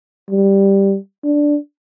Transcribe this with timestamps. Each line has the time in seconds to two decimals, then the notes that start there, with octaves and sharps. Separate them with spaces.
0.30 G3
1.24 D4